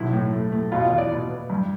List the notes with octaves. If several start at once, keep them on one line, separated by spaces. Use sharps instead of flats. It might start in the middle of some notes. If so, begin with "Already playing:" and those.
Already playing: B1 C3 E4
A2
A3
A3
B2 F4
F4
E2
D5
B2
B3
G2